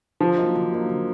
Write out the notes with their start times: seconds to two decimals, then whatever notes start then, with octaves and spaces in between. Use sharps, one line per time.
0.21 D3 F3
0.38 F#3 A#3 D#4
0.55 D3
0.72 F#3 A#3 D#4
0.90 D3